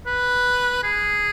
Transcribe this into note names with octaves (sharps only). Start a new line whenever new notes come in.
B4
G#4